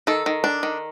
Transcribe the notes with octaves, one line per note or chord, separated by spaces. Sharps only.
D#3 A4
D#3
D4
D#3